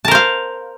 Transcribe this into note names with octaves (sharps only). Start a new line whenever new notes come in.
A#4 C5 F5 A5